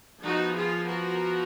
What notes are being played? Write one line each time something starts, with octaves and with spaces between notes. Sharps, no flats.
F3 B3 D#4 F#4
F4 G#4
F#4 A#4